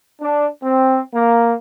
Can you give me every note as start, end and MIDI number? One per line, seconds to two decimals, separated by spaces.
0.21 0.46 62
0.63 0.98 60
1.14 1.54 58